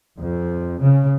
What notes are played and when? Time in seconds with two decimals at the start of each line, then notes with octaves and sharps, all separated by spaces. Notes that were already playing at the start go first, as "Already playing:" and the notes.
0.19 F2
0.82 C#3